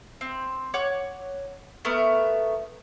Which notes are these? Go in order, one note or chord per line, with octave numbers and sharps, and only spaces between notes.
C4
C#5 F#5 D6
A3 B3 A#4